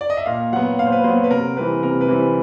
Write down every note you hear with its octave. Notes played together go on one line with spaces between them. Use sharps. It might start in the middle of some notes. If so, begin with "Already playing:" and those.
D5
D#5
E5
A#2 F5
F#3 B3 F#5
A#2 F5
C5
B4
F#3 B3 C5
B4
C3 A#4
E3 G3 C4 B4
C3 A#4
B4
E3 G3 C4